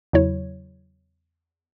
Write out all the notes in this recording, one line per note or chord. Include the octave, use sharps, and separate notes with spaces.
E2 C#3 F#3 E4 C#5